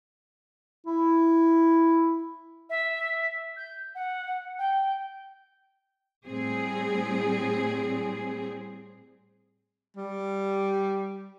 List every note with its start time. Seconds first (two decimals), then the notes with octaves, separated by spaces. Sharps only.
0.87 E4
2.70 E5
3.57 G6
3.95 F#5
4.59 G5
6.25 A2 G3 C4 G#4
9.96 G3